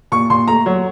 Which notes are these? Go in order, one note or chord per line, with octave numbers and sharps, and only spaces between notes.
A#2 C#6
A#2 C6
A3 A#5
F#3